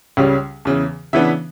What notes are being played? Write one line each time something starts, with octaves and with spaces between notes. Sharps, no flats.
C#2 C#3 G3 C#4
E2 C#3 E3
C#3 E3 B3 D4 E5